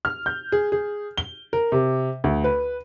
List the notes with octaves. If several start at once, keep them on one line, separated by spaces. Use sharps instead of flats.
F6
G6
G#4
G#4
G7
A#4
C3
D2
B4